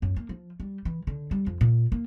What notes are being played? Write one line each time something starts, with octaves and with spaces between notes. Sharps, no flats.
F#2
A#3
F3
G3
E3
D3
G3
F2
A#2
A#3